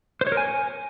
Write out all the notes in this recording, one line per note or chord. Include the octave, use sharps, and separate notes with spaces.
C5
C#5
A#4
G#5